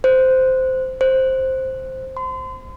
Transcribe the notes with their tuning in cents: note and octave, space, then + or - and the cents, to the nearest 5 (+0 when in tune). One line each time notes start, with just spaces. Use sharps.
C5 -10
C5 +5
C6 -35